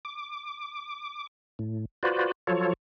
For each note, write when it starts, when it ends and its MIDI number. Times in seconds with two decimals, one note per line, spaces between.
0.05 1.27 86
1.59 1.85 45
2.03 2.32 65
2.03 2.32 66
2.03 2.32 71
2.03 2.32 72
2.03 2.32 74
2.47 2.73 53
2.47 2.73 54
2.47 2.73 65
2.47 2.73 69
2.47 2.73 73